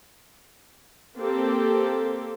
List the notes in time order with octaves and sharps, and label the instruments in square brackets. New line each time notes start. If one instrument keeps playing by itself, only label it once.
[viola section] A#3 C4 G4 A4